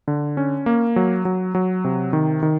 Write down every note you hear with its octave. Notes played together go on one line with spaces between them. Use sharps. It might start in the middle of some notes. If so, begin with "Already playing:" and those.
D3
C#4
A#3
F#3
F#3
F#3
C3
D#3
D#3